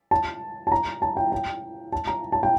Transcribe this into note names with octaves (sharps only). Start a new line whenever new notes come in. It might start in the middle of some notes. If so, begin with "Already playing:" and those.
A5
A5
A#5
A5
G5
G5
A5
A#5
A5
G5